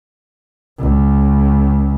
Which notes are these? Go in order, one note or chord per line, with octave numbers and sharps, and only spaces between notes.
C#2